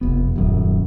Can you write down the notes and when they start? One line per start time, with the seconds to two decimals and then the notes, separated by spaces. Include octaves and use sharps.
0.01 F1 B3
0.36 D#1 F#2